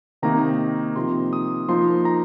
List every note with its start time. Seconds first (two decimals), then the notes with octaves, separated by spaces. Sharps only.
0.22 C3 D#3 A#3 D#4 A#5
0.96 C3 F3 A#3 D#4 C6
1.33 D#6
1.69 F3 A#3 D#4 C6
2.05 A#5